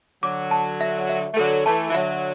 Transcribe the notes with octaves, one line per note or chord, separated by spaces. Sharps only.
D3 F#3 D6
A5
E5
E5
A3
D3 F#3 A4
E3 A3 A5
E3
D3 F#3 E5